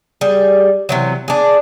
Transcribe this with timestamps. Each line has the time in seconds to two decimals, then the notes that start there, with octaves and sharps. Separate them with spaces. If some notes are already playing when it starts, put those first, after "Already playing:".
0.21 G3 G#4
0.89 C3 E3 F#3
1.28 D4 G#4